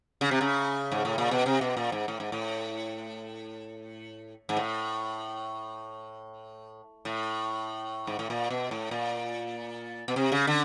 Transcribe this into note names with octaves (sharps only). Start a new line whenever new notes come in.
C#3
C3
C#3
G#2
A2
A#2
B2
C3
B2
A#2
G#2
A2
G#2
A2
G#2
A2
A2
G#2
A2
A#2
B2
A2
A#2
B2
C3
C#3
D3